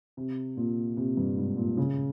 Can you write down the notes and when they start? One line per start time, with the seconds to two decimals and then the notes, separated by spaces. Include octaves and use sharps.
0.17 C3
0.57 A#2
0.97 C3
1.17 G2
1.38 G#2
1.57 A#2
1.77 C#3